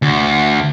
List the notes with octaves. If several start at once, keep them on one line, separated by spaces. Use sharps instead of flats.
D2